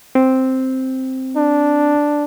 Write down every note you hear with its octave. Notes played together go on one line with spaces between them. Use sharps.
C4
D4